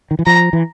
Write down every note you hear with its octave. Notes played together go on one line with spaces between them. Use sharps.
D#3
E3
F3 A#5
E3